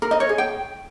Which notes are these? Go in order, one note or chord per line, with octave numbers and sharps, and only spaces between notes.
A#4
D#5
C#5
G#4
G5